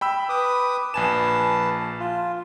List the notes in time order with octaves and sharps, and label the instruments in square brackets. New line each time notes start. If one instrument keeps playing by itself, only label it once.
[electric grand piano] G5 B5 E6
[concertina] B4 D6 D#6
[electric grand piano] A#1 G#5 E7 [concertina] B4 A5
[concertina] F4